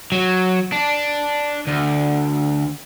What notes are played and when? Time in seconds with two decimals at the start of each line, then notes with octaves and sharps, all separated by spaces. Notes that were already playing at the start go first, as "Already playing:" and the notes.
0.12 F#3
0.72 D4
1.67 D2